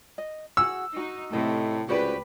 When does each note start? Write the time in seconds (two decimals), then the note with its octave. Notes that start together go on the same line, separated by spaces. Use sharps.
0.18 D#5
0.57 F#4 G#4 F#5 E6
0.96 D#4 F#4
1.33 A2 C3 A3 A4 D#5
1.89 C#2 F#4 G4 B4 C5 D5